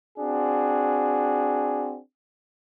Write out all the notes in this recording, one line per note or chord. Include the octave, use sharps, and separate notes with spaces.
C4 D4 F#4 G#4